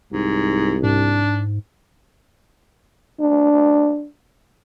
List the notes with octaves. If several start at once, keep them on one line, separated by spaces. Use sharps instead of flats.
C2 G#2
G#2 D4
D4